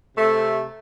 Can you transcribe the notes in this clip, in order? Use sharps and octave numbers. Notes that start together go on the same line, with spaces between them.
C3 A3